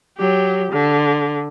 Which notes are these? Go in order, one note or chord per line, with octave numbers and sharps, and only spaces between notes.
F#3 G4
D3